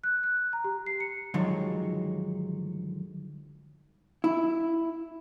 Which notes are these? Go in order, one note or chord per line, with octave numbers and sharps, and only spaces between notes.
F#6
F#6
A#5
G4
C7
C#7
G2 D3 D#3 F3 F#3 G#3
E4